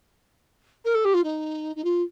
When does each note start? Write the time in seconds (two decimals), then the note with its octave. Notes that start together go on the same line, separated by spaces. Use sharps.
0.85 A#4
0.94 A4
1.05 G4
1.14 F4
1.24 D#4
1.76 D#4
1.84 F4